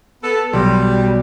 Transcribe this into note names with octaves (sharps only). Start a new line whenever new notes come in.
B3 A4
B1 G3